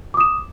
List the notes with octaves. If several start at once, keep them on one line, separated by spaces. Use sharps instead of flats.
D6 D#6 E7